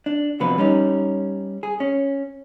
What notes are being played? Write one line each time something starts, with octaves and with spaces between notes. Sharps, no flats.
D4
C3 F3 F#3 B3 B4
G3 C#4 D#4
G#4
C#4